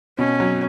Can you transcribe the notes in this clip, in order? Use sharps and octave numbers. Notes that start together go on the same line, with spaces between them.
B2 C#4
F#3